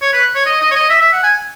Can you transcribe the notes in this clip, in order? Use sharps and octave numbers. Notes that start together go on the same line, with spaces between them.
C#5
B4
C#5
D#5
D#5
C#5
D#5
E5
E5
F#5
G#5